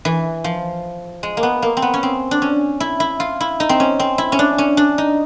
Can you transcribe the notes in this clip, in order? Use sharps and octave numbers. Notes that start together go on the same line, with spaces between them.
E3
F3
G#3
A#3
B3
A#3
C4
B3
C#4
C4
D4
C#4
E4
E4
F4
E4
D#4
C4
C#4
C4
E4
C#4
D4
C#4
D4
D#4